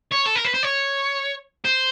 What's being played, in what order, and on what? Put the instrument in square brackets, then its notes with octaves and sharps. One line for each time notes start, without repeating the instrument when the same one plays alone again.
[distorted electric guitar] C#5
A4
A#4
B4
C5
C#5
C5